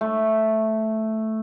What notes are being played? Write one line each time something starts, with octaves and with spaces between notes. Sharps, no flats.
A3